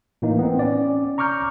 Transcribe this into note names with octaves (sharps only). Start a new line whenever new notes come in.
A2 E3 A#3 D#4
B3 C4
C#4 D5
A#5 C#6 D6 F6 G6